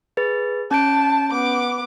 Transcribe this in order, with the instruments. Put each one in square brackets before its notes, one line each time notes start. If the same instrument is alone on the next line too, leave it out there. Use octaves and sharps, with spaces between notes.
[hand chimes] G#4 B4 A6
[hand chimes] C#4 G6 D7 [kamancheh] A5
[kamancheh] B3 D6